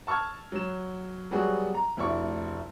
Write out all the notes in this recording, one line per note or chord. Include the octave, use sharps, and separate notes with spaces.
A5 C#6 E6 F6 G#6
F#3 E7
F#3 G3 B3 F#4 G#4
A#5
F1 D2 E4 D5 C#6